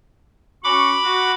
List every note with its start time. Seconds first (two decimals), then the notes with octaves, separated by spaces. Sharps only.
0.64 C#4 F#4 B5 C#6 D6
1.04 F#4